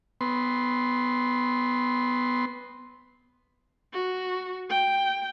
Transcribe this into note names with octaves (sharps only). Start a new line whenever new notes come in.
B3 C6
F#4
G5